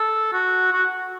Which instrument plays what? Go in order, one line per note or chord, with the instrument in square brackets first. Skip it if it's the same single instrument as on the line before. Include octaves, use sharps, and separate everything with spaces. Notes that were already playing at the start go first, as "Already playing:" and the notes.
Already playing: [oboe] A4
F#4
F#4